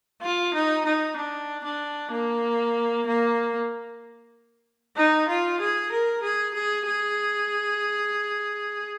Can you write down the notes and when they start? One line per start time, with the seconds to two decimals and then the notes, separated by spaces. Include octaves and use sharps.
0.22 F4
0.54 D#4
0.85 D#4
1.17 D4
1.64 D4
2.12 A#3
3.06 A#3
4.96 D#4
5.28 F4
5.60 G#4
5.92 A#4
6.23 G#4
6.54 G#4
6.87 G#4